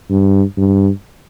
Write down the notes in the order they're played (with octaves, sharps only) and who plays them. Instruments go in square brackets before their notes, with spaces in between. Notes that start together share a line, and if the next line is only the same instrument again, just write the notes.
[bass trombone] G2
G2